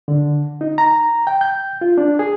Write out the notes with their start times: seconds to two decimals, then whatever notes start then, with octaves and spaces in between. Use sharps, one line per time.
0.08 D3
0.61 D#4
0.78 A#5
1.27 G5
1.41 G6
1.81 F4
1.98 D4
2.19 G#4